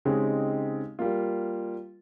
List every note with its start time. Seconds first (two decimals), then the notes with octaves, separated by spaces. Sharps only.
0.05 C#3 G#3 C4 D#4 G4
0.99 G3 A#3 F4